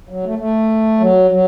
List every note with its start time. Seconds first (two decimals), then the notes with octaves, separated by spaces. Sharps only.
0.09 F#3
0.24 A3
0.39 A3
1.00 F#3
1.31 F#3